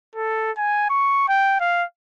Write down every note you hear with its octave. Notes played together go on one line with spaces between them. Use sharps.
A4
G#5
C#6
G5
F5